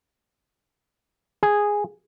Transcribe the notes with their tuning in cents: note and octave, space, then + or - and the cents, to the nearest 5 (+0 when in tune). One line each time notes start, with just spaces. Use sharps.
G#4 -5